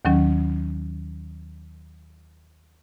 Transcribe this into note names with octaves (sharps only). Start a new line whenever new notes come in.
D#2 D#3 F#3 C#4